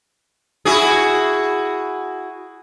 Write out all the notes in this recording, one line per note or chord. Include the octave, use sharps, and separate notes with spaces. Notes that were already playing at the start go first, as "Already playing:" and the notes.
E4 F#4 G#4